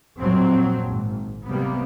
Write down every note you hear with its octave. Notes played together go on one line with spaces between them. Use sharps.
F2 A#2 F#3 C4
G#1
C3 G3 A#3 B3